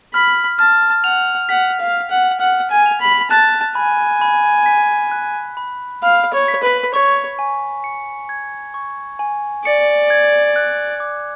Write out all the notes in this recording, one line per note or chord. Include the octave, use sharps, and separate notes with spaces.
B5 F6
A5 F6
F#5 F7
F#5 B6
F5
F6
F#5
F#5 F6
G#5
F7
B5
A5 F#6
G#5 B5
B5
B6
F#6
B5
F5 B5
C#5
B6
B4
C#5 C#6
G#5
C#7
G#6
C#6
G#5
D5 C#7
G#6
F#6
D6